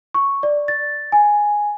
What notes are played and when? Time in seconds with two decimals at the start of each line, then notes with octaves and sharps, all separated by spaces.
0.14 C#6
0.43 D5
0.68 A6
1.12 G#5